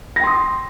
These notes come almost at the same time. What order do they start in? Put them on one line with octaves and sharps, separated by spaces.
A#6 G5 C6 D#6